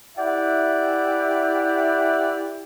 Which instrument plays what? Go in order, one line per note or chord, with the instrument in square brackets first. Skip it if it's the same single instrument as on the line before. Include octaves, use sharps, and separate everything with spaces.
[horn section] E4 G4 D5 E5 F#5